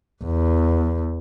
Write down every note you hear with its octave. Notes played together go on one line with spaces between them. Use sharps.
E2